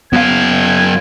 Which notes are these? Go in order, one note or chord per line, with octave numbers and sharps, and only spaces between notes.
F#2 B3 F5 G#6